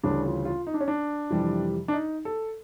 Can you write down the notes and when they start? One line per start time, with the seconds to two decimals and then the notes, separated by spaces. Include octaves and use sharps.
0.03 D2 C#3 E3 G3 D4
0.25 F4
0.45 F4
0.67 D#4
0.74 D4
0.80 C#4
0.88 D4
1.30 F2 C3 E3 G3
1.88 D4
1.93 D#4
2.25 A4